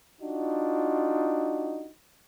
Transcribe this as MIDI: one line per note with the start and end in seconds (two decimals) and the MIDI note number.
0.20 1.89 62
0.20 1.89 63
0.20 1.89 65
0.20 1.89 66